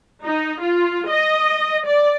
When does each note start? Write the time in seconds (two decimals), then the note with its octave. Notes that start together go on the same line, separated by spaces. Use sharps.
0.24 D#4
0.62 F4
1.10 D#5
1.87 D5